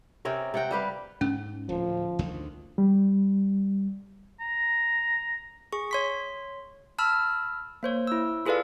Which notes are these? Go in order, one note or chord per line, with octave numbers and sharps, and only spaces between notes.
C3 C4 C#4 A#4
C3 F#5 G5
G3 G4 B4 F5
G#2 C#4
D1 F3
D2 D3 D#3
G3
A#5
G#4 C#6
C#5 C6 B6
A5 B5 E6 F6
A#3 C5 C#5
E4 E6
F4 G#4 A4 B4 D5 F5